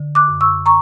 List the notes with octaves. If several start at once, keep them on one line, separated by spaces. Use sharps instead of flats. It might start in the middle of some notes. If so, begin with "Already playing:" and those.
Already playing: D3
D6 F#6
F#2
C#6 E6
A#5 C#6